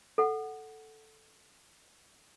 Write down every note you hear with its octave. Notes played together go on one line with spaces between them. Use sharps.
A4 F#5